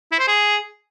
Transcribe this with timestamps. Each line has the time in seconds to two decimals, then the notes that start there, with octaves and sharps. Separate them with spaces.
0.12 E4
0.20 C5
0.28 G#4